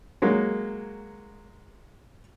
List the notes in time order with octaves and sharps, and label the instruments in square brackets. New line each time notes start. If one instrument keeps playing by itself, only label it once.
[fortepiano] F#3 G#3 A#3